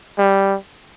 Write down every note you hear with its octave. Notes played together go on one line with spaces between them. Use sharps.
G3